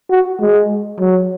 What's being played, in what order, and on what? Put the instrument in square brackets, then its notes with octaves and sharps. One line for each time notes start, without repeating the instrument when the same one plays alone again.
[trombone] F#4
G#3
F#3